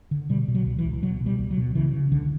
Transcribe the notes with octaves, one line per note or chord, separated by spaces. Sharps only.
D3
B2 G3
B2
F#3
C#2
E3
C#2
B2 F#3
B2
G3
C#2
F#3
B2
C#3 E3
C#3
C#2 D3